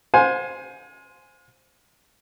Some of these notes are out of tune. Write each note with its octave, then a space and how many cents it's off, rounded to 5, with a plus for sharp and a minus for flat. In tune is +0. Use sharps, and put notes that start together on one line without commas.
C5 +0 F5 +45 G#5 +5